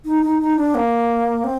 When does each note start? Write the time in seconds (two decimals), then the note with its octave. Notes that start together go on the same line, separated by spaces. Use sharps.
0.05 D#4
0.23 D#4
0.40 D#4
0.57 D4
0.75 A#3
1.44 C4